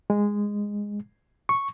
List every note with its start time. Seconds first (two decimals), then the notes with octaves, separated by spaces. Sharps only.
0.10 G#3
1.49 C#6